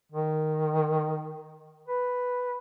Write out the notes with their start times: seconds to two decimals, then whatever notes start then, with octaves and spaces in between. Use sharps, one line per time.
0.12 D#3
1.88 B4